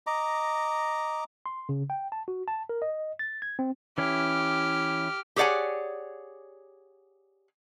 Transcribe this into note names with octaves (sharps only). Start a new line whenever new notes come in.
D#5 A#5 D6
C6
C#3
G5
A5
F#4
A5
A#4
D#5
A6
G#6
C4
E3 C#4 E4 G4 F6
G4 G#4 C#5 D5 F#5 G#5